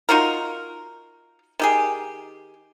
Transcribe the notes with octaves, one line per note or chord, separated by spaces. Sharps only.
D#4 F4 F#4 A#4
D#3 G4 G#4